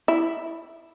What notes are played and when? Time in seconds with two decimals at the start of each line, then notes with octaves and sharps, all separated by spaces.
0.08 E4